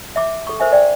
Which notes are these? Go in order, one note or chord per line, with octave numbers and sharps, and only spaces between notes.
E5 D6
A4 C#6
A#4 C5 E5 G#5
D5 G5